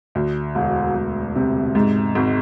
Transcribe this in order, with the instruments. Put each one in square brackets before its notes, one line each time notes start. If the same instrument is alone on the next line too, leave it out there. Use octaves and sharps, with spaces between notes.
[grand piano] D2
E1
E1
C3
G#2
G#1